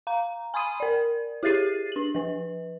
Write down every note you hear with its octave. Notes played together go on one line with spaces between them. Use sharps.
F5 A#5
G#5 B5 C6 D#6 D#7
A#4 D5
E4 G4 G#4 A6 C7 D#7
D4 F#7
F3 B4